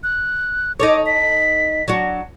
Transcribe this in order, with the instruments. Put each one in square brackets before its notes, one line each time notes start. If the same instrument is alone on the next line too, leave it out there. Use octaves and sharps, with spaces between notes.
[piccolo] F#6
[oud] D#4 A4 C#5 [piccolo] D6
[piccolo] B6
[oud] F#3 D4 F#4